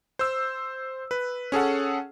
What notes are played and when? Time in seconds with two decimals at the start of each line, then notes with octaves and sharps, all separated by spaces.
0.19 C5 E6
1.11 B4
1.52 C#4 G#4 A4 F#5